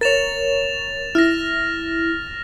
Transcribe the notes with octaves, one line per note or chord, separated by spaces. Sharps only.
A#4 C#5 A6 E7 F7
E4 F6 A#6